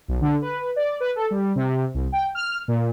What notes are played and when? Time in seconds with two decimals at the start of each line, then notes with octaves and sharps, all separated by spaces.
0.08 B1
0.21 D3
0.42 B4
0.76 D5
1.00 B4
1.16 A4
1.31 G3
1.56 C3
1.94 C2
2.12 G5
2.35 F6
2.68 A#2